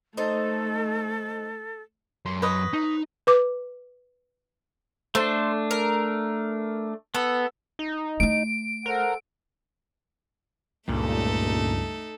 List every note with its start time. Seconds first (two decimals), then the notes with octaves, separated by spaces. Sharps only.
0.17 A3 D#4 A4 C5
2.25 F#2 C6
2.42 B4 C#5 D#5
2.73 D#4
3.27 B4 D6
5.15 A3 D4 A4 C5
5.71 A#4
7.15 B3 A4
7.79 D#4
8.20 A3 E4 D7
8.86 A4 A#4 C5 F#5
10.89 C#2 G2 A#2 A3 D#4 A4